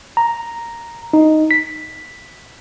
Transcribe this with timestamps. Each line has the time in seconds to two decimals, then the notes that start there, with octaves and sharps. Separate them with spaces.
0.17 A#5
1.13 D#4
1.51 B6